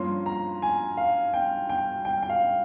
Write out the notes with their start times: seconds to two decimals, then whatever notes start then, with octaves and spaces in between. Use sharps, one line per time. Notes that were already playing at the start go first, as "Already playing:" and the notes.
Already playing: G2 F3 A#3 C#4 C6
0.26 A#5
0.62 G#5
0.97 F5
1.34 G5
1.69 G5
2.05 G5
2.23 G5
2.29 F5